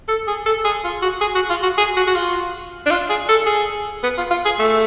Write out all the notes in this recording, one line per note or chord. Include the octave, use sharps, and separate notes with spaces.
A4
G#4
A4
G#4
F4
F#4
G#4
F#4
F4
F#4
G#4
F#4
F#4
F4
D4
F4
G#4
A4
G#4
B3
F4
F4
G#4
A3